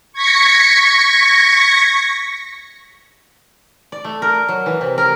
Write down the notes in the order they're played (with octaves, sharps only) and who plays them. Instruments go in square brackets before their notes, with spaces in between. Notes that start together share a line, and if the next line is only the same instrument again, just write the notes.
[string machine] C#6 G#6 A#6 B6 C#7
[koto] D5
A3
A#4
F#3
E3
C3
A#4